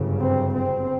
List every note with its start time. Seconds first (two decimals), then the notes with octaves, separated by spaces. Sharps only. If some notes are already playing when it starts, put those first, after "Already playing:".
Already playing: G1 F#2 C#3
0.20 C4
0.54 C4